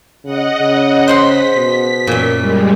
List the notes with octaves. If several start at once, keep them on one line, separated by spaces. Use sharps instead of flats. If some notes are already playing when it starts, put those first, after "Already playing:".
C#3 D#5 F#5
C#3
C5 F#5 C6 B6
B2
F#2 A#2
G3 G#3